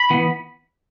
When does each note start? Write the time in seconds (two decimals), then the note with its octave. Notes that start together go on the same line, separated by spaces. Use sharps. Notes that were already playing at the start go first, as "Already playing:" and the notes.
Already playing: B5
0.10 E3 B3